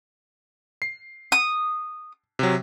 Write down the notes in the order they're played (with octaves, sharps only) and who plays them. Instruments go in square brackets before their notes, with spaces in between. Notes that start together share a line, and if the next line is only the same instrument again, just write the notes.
[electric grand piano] C7
[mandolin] D#6
[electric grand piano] C3 F#3